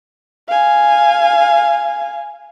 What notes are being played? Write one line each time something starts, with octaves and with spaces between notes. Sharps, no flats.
F5 G#5